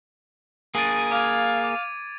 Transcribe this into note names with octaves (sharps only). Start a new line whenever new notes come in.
A#3 G#4 A6 D7 D#7
F5 D6 G#6
D6 D#7